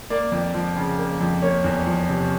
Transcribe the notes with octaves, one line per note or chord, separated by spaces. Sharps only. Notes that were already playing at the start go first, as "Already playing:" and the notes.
A#3 D5
F2
F3
C#3
A#3
F2
A#3 C#5
E2
F3
C3